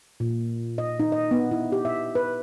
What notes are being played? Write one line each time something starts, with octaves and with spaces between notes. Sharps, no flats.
A#2
D#5
D#4
D#5
B3
E4
G4
E5
B4